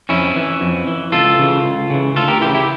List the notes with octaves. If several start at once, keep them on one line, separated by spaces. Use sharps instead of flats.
F2 C#4 E4
E3
F2
E3
C#2 F4 A4
C#3 E3
C#2
C#3 E3
D2 F4 A4
G4 A#4
C#3 E3 E4 G4
E4 G4